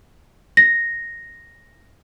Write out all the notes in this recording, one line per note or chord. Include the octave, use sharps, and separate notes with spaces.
A#6